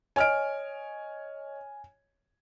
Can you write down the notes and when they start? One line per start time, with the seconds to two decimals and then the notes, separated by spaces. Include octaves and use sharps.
0.16 C#5 D#5 G#5 F6 D7